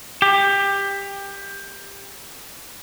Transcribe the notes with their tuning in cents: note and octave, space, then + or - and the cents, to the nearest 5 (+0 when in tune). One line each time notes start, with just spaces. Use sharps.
G4 +20